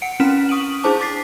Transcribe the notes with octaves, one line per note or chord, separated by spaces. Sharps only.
F#5 C#7 D7
C4 C#4 E4 F6 B6 E7
C#6 D#6 D7 D#7 F#7
D4 E4 G#4 C5 A5 D6
D6 A6 B6 C7